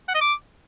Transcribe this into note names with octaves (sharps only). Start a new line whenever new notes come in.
F#5
D#5
D6